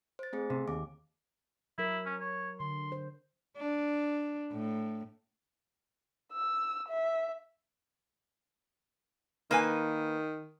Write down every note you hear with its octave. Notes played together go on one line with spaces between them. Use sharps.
C5 A6
A3 C4 G#4
C3
D#2 D6
F#3 E4 A#4
C#4
C#5
D3 C6
C5
D4
A2
E6
E5
D#3 A#3 B4 G#5